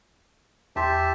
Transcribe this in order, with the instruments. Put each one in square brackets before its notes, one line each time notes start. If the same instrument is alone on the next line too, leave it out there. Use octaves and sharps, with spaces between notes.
[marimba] E2 C6 [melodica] G4 E5 A5